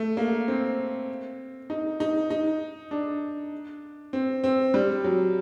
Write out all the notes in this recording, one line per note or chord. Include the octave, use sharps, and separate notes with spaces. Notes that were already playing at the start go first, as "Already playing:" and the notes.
Already playing: A3
A#3
C4
D#4
D#4
D#4
D4
C4
C4
G3
F#3